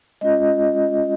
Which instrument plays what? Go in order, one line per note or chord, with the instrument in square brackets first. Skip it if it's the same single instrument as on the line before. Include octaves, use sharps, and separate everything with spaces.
[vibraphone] G#3 C#4 F4 D#5